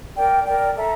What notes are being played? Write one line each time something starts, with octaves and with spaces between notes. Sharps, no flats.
A#4 D5 G5
A#4 D5 G5
A4 E5 A#5